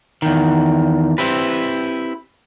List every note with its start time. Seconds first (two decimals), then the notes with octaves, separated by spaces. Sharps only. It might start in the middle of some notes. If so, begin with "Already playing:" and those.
0.22 E2 D#3
1.18 C4 E4 G4 B4